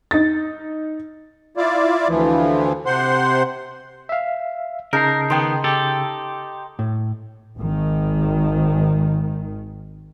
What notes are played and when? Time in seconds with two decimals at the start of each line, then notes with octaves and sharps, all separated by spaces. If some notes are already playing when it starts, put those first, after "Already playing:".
0.11 D#4 A6
1.57 E4 F4 D5
2.08 D2 E3 F3
2.86 C3 C5 F#5 C6
4.09 E5 F5
4.93 C#3 D#4 A#4 A5 C7
5.30 D#3 B3 G5 C6
5.64 G4 A4
6.79 A2
7.58 G#1 D#3